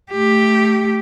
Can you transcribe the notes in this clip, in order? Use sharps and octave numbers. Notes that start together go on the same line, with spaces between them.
A3 G4